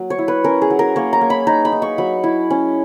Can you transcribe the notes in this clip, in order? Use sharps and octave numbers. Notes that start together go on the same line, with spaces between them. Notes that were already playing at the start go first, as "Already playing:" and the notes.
Already playing: F#3 A#3
C#5
E4
B4
C#4 A#4
G#4
F#3
A#4
A#3 C#5
A#5
A#3
B5
D#4 A#5
B5
D#4
C#6
F#3 B5
E4
C#4